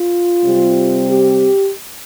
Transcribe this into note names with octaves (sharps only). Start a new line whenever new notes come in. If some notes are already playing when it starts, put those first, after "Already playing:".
Already playing: F4
C3 G3 C4
G4